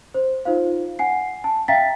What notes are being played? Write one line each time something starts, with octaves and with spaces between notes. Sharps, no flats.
C5
D#4 F4 C5 F5
F#5 G#5 C7
A5
E5 F5 G5 A#5 A6 B6